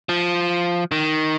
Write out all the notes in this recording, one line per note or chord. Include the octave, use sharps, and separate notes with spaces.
F3
D#3